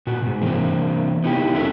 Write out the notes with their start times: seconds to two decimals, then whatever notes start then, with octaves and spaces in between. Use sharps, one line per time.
0.07 A#2 F#4
0.22 G#2 B2
0.41 C3 E3 A#3 C4
1.24 B3 D#4 E4 G4
1.54 E2 C#4 F4 A4 A#4 E5